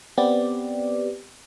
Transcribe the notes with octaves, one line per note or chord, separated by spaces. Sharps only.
B3 C4 G4 D5